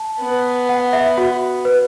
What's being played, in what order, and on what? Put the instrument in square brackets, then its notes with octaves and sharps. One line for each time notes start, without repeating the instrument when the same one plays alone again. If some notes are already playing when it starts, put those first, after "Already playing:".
Already playing: [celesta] A5
[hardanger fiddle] B3
[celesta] F#5
E5
F#4
B4